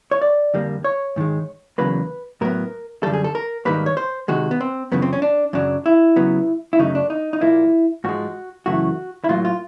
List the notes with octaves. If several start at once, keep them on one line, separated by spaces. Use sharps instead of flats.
C#5
D5
F2 D3 G3 A#3
C#5
G#2 D#3 G#3
E2 C#3 F#3 A#3 B4
A2 F#3 B3 A#4
F#2 D3 G3 A4
G#4
A4
A#4
G#2 D#3 G3 A#3 B4
C#5
C5
C3 D#3 G#3 F#4
B3
C4
F#2 C#3 F3 B3
C4
C#4
D4
F#2 C#3 F#3 D4
E4
C#3 F#3 B3
E4
F#2 C#3 F#3 A3 D#4
D4
D#4
D#4
A#2 F3 A#3 E4
G#2 F3 G#3 F#4
F#2 C#3 E3 A3 F#4
E4
A2 F#3 A#3 F4
F4